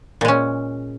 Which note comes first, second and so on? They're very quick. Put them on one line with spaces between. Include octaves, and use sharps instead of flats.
A#2 G#3 C#4